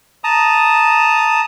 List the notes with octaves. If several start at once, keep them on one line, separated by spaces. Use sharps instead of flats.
A5 A#5 D#6